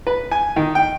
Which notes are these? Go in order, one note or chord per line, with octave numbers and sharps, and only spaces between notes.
B4
G#5
D#3
G5